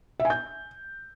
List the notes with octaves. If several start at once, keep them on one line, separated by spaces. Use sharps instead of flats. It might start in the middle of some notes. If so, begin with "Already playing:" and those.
E5
G#5
G6